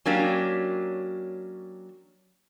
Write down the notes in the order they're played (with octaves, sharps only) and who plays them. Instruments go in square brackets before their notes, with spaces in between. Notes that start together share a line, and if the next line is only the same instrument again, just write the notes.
[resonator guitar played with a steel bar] F#3 A#3 C#4 D4 G4